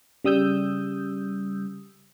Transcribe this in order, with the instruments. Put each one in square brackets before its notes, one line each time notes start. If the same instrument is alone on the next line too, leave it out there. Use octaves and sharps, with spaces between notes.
[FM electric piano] C#3 G3 D#6 E6 G6